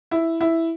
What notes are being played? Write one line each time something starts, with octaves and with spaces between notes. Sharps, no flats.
E4
E4